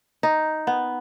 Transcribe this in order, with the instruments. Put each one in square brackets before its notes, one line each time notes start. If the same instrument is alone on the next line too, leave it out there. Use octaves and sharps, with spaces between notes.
[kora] D#4
B3